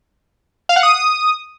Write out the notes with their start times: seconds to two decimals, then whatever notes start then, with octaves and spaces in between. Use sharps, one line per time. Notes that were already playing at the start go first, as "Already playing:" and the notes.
0.69 F5
0.76 F#5
0.83 D#6